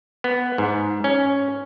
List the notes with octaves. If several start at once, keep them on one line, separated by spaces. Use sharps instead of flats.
B3
G#2
C#4